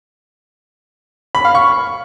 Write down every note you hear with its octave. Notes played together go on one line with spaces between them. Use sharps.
B5
F5
C#6